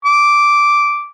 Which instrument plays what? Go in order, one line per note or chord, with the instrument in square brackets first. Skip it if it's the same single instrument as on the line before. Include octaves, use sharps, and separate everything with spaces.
[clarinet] D6